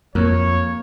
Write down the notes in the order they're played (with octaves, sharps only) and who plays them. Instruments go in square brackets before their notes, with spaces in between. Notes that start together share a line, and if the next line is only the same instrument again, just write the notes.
[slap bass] F2 [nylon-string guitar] A#3 [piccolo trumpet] C#5